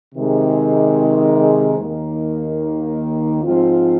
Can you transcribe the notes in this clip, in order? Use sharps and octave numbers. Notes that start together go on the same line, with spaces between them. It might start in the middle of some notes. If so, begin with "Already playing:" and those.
C3 D#3 G#3
D#2 D#3 A#3
G#2 F3 C4 F4